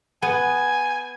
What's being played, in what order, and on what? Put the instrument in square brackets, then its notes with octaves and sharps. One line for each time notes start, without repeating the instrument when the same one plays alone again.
[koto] B3 [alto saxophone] G#5